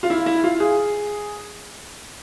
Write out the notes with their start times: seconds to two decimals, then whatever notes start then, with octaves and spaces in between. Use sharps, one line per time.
0.03 F4
0.10 E4
0.26 E4
0.44 F4
0.60 G#4